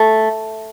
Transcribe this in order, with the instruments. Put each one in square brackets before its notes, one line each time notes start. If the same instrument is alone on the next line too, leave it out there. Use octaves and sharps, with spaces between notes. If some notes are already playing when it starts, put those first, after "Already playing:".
Already playing: [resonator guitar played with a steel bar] A3